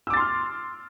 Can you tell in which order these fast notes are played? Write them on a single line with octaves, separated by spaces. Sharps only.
E6 D6 A6 C6 F6